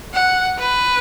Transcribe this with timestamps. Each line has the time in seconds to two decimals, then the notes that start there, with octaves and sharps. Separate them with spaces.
0.14 F#5
0.58 B4